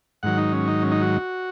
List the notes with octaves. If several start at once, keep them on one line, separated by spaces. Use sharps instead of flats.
G#2 D#3 F#3 F#5
D#4
C#4
D#4
C#4
D#4
F#4